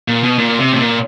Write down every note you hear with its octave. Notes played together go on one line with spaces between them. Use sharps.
A#2
B2
A#2
C3
A2
A#2